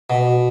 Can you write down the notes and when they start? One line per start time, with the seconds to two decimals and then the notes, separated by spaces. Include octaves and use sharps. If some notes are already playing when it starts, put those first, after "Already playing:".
0.10 B2